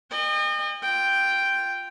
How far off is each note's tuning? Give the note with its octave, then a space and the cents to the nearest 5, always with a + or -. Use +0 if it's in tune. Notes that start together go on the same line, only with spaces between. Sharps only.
D#5 -35 G5 +40
F4 +0 G5 +0